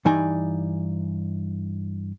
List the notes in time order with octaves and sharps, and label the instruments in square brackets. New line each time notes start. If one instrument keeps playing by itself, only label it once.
[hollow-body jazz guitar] G2 E3 D#4 D5 G#5